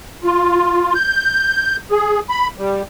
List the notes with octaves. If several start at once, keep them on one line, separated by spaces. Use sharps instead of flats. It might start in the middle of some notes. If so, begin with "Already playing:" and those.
F4
G6
G#4
B5
G3